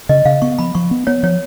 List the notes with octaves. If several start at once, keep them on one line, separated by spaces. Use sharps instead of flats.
C#3 D#5
C#3 F5
B3 C#6
F3 B5
F3 C#6
B3
B3 C#5
F3 C#5